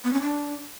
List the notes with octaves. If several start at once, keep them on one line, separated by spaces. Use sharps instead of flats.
B3
C#4
D4